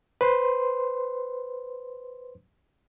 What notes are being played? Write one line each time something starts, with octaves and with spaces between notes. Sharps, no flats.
B4 C5 C6